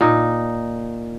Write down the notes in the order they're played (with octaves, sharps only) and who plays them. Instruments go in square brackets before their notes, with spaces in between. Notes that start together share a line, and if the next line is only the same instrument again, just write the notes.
[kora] A#2 D#4